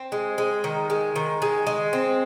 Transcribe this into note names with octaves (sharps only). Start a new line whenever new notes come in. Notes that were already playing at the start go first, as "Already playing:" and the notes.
Already playing: C4
G#3
G#3
D#3
G#3
D#3
G#3
G#3
C4